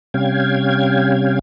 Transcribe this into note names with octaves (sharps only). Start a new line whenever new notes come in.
C3 G3 C#4 F5 G5 G#6